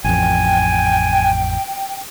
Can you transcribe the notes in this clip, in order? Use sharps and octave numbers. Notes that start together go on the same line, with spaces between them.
A1 F2 G5 G#5